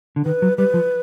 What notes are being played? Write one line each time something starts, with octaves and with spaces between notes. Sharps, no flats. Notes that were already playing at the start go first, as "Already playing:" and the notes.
D3
D#3 B4
F#3
G3 B4
F3